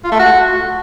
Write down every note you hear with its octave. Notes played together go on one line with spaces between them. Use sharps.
F4
A3
F#4